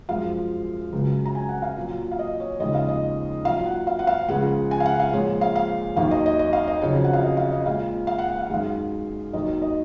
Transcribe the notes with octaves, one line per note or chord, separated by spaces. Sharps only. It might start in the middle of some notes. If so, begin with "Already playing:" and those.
F#2 F3 G#3 F5
C#2 C#3 F#3
A#5
G#5
F#5
F5
A#2 F#3
F5
D#5
C#5
D#2 C#3 F3 G#3 D#5
F5
D#5
A#2 F#3 F5
F#5
F5
F#5
F5
C#2 C#3 F3 G#3 F#5
G#5
F5
F#5
F5
A#2 F3 G#3 C#5
F5
F5
D#2 D#3 F#3 F5
D#5
D#5
D#5
F5
D#5
F2 C#3 F#3 C#5
F#5
F5
D#5
F5
D#5
A#2 G#3 F5
F5
F#5
F#5
F5
F#5
F#2 D#3 G#3 F5
D#2 D#3 F#3 D#5
D#5